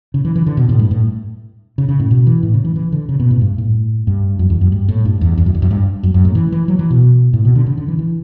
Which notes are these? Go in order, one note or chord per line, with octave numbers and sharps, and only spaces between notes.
C#3
E3
E3
D3
B2
A2
G2
A2
C#3
C#3
A2
B2
E3
A2
C#3
E3
E3
D3
C#3
B2
A2
G2
A2
G2
F#2
E2
F#2
G2
A2
G2
E2
E2
F#2
E2
F#2
G2
F#2
F#2
A2
E3
E3
F#3
E3
B2
A2
B2
D3
C#3
D3
E3
E3